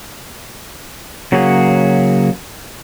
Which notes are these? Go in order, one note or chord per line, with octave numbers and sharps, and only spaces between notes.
C#3 F#3 A#3 F#4 G#4